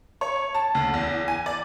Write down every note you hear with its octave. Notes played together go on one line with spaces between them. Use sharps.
C#5
A5
D2
E2
G#5
D5